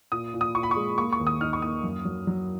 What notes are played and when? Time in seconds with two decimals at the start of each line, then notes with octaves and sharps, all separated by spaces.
0.12 A#2 D#6
0.34 A#2
0.41 D#6
0.55 A#2 C#6
0.63 B5
0.71 C#6
0.76 G#3
0.98 A#3 C#6
1.13 C#6
1.20 D#2
1.27 D#6
1.41 D#4 F6
1.53 C#6
1.62 A#3 D#6
1.84 F#2
2.05 F#3
2.27 F#3